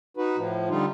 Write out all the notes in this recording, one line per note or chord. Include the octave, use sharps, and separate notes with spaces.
D#4 F#4 B4
A2 F3
D3 G3 D#4 F4